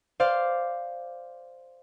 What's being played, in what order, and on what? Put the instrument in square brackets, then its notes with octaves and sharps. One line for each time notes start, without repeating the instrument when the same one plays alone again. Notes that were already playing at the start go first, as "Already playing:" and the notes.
[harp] C5 D5 F5